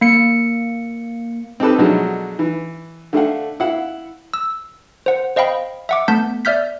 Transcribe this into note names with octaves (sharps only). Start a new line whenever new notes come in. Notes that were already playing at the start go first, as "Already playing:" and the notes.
A#3 C#7
C4 D#4 G4 A4 B4
B2 D3 F3 F#3 G#3 A3
E3
D3 A3 F5 F#5
E4 F5 F#5
E6
C5 F#5
C5 D#5 F5 G5 B5
E5 F#5 D6
A3 B3 A5 G6 B6
D5 E5 F6 G6 B6